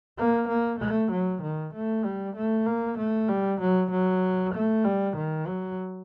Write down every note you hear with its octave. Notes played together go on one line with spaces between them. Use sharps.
A#3
A#3
A3
F#3
D#3
A3
G3
A3
A#3
A3
G3
F#3
F#3
A3
G3
D#3
F#3